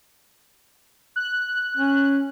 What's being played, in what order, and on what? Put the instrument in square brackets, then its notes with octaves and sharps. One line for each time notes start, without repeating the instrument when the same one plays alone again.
[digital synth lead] F#6
[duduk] C#4